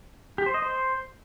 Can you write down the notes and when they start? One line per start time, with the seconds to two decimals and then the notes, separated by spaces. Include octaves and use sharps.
0.38 G4
0.46 C5
0.54 D#5
0.62 C5